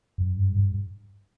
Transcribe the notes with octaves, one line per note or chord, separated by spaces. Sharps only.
F#2
G2
G2